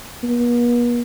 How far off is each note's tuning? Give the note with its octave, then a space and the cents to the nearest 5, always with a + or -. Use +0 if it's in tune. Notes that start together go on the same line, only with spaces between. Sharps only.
B3 -45